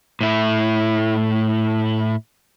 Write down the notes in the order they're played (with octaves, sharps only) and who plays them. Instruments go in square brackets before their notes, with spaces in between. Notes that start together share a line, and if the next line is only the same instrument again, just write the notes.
[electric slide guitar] A2 E4